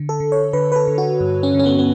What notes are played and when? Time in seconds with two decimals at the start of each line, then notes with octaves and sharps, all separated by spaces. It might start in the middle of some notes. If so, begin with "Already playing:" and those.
Already playing: D3
0.09 A4
0.20 D3
0.32 C#5
0.53 D3 B4
0.72 B4
0.76 A4
0.87 D3
0.98 F#4
1.20 G2
1.43 C#4
1.54 D3
1.59 C#4
1.66 B3
1.79 B3